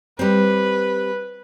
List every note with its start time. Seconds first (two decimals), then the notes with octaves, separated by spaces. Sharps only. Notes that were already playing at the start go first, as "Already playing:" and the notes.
0.19 G3 C4 B4